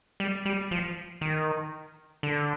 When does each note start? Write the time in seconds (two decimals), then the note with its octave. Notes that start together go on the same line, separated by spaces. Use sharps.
0.20 G3
0.45 G3
0.71 F3
1.21 D#3
2.23 D3